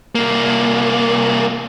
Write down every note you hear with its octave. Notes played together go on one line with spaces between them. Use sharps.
C2 A#3